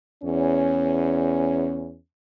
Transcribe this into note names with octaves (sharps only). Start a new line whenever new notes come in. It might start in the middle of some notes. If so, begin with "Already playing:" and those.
E2 C#4